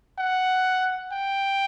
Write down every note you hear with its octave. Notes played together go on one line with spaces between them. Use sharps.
F#5
G5